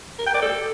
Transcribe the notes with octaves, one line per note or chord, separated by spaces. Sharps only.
A#4
G5
D5
A4